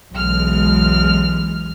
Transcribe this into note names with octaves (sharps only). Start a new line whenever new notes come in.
B1 E2 E3 G#3 F6